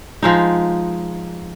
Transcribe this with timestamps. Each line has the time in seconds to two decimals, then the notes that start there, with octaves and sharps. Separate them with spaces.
0.23 F3 G#3 D#4